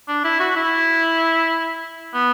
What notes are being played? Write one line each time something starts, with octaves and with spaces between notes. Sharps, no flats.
D4
E4
F#4
E4
B3